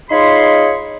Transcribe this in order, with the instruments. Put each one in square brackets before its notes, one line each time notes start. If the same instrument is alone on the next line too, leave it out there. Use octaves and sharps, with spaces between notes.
[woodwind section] D#4 F4 G#4 C#5 B5 C6